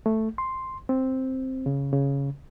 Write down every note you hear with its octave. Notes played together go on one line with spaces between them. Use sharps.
A3
C6
C4
C#3
C#3